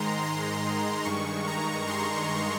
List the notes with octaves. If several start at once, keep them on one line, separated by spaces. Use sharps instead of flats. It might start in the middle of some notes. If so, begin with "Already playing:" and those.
Already playing: G#2 D#3 G#3 A#5 C6
C6
G2 D#3 G#3 C#6
A#5
C6